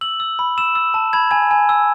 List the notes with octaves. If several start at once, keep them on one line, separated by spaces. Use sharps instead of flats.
E6 F#7
E6
B5
E6 E7
E6
A5
B5 G#6
G#5 G#6
G#5
E6